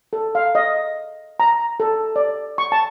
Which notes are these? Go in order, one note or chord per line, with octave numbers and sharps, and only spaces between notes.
A4
F5
D#5
A#5
A4
D5
C#6
A5